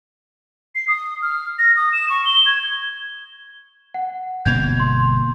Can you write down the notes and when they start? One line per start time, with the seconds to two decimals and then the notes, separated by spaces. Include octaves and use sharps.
0.75 C7
0.88 D#6
1.22 F6
1.59 A#6
1.77 D#6
1.93 E7
2.10 C#6
2.26 G7
2.46 G#6
3.94 F#5
4.45 G1 B2 A#3 G6 G#6 F7
4.80 C6